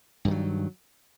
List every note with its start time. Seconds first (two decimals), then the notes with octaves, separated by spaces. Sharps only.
0.25 G2
0.28 D#3
0.31 F#3